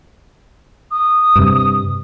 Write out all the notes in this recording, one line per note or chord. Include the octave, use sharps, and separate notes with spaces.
D#6
G2 C3